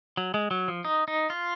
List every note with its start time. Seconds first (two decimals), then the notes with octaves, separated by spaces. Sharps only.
0.17 F#3
0.34 G#3
0.51 F#3
0.68 F3
0.85 D#4
1.08 D#4
1.30 F4